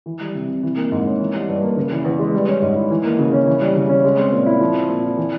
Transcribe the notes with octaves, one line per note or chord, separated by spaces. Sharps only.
E3
G3
C3
C3
E3
A#3
G#2
C#4
E3
G3
G2
A#3
C#3
E3
E2
G#3
G3
C#4
G#2
E4
E3
A#3
C#3
C#4
E3
G3
C#3
C#4
G#3
C4
A#2
E4
F3
C4
A#2
E4
E3